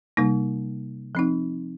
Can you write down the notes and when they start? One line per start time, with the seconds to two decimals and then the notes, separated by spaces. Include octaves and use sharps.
0.17 C3 G3 A#3 D#4
1.15 F3 C4 D#4